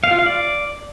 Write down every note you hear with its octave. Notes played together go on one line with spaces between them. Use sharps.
F5
F4
F5
D5